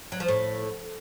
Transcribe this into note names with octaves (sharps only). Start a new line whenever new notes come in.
F#3
F3
A2